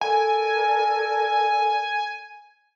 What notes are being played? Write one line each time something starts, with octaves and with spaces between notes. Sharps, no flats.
A4 A#4 D5 G#5